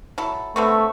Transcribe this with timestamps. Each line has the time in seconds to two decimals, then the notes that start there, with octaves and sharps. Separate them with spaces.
0.18 F#3 E4 A4
0.56 D3 A3 B3 C4 C#6 E6